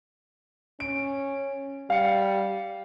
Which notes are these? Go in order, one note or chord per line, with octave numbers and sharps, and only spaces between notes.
C#4 D7
G3 F5 C#7